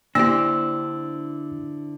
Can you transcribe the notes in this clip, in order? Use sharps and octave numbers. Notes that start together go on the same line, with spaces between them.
D3 A#3 D4 E4 G4 C5 E6